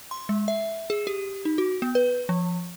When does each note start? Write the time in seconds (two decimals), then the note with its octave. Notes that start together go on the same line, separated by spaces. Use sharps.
0.11 C6
0.29 G#3
0.48 E5
0.90 G#4
1.07 G4
1.45 D#4
1.58 F#4
1.82 B3
1.95 B4
2.29 F3